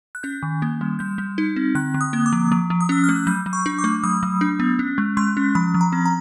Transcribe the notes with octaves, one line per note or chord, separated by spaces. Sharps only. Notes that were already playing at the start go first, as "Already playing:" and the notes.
F#6
C#4 G6
D#3
A#3
G3
G3 G6
G3
D#4
C4
D3 F#6
D3
D#6
A#3
D6
F3
F3
F3
D#6
C#4 E6
F6
A3
F#6
F#3 G6
F#3
C#6
D4
D6
A3
F#3 D#6
F#3
D4
B3
C#4
G#3
G#3 C6
C#4
F3 B5
F3
A#5
C4
A#5